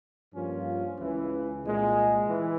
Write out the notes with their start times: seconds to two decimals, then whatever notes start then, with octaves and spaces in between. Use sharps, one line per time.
0.33 G2 F3 A#3 C#4 F4
0.99 C#2 C#3 E3
1.64 C2 A#2 G#3
2.28 E3